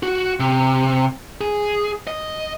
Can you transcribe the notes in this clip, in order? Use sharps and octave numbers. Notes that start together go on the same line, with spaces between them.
F#4
C3
G#4
D#5